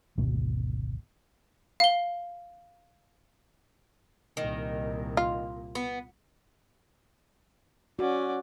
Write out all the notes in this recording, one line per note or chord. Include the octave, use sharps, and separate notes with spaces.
G#1 D2 B2 F#3
F5 G7
C2 A#2 D#3
F4
B3
C#4 F#4 D5